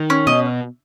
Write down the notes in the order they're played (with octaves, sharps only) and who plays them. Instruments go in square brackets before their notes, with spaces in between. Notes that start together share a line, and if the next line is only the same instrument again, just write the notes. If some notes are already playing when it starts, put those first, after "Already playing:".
Already playing: [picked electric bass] D#3
[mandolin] C#4
[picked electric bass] B2 [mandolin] D#5